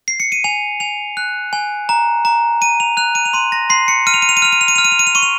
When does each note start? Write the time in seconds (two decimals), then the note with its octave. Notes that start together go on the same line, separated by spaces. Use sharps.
0.08 C7
0.20 C#7
0.32 D#7
0.44 G#5 F7
0.80 G#5 F7
1.17 F#6
1.53 G#5
1.89 A#5
2.25 A#5
2.61 A#5 D#7
2.80 F7
2.97 F#6 F7
3.15 D#7
3.25 F7
3.33 C6 D#7
3.52 A#6
3.70 C6 C7
3.88 C#7
4.07 F6 D#7
4.14 F7
4.22 D#7
4.29 F7
4.37 D#7
4.42 F6 F7
4.52 D#7
4.61 F7
4.68 D#7
4.76 F7
4.78 F6
4.85 D#7
4.92 F7
4.99 D#7
5.07 F7
5.15 C#6 D#7
5.23 F7